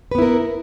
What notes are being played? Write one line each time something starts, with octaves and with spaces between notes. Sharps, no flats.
B3 E4 A#4 B4